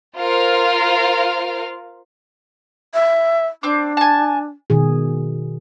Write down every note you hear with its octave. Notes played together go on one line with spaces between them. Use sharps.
F4 A#4 C5 F5
E5
C4 D4 D6
G#5 A5
B2 D#3 G#4